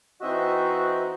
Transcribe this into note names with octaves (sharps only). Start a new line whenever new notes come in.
E3 C4 D#4 F#4 D#5 E5